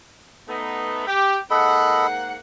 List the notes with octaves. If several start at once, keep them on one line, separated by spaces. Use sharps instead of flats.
A3 B3 D#4
G4
G#2 A#3 A4 D#5 F#5 B5